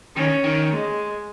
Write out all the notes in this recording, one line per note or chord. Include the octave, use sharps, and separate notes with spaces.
D#3 C#4
D#3
G#3